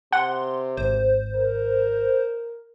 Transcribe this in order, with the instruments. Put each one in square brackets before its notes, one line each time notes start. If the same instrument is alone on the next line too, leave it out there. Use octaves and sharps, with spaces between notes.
[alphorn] C3 [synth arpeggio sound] F#5 [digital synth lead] C6
[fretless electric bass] G#1 [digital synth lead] C5
[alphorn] A#4